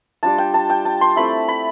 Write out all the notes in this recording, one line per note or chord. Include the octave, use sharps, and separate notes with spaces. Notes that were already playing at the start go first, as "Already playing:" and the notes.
G3 D4 F4 A5
G5
A5
G5
A5
C6
A3 C4 E4 B5
B5